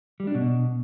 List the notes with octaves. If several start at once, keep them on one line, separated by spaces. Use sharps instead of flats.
G3
D4
B2